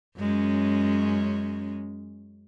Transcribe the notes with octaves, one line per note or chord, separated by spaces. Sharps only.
F#2 G#3 C#4